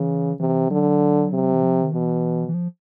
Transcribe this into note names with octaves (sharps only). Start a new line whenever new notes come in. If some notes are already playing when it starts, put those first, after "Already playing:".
Already playing: C#3 E3
C3 E3
D3 F#3
C3
E3
F3
D#3
B2 E3
E3
F3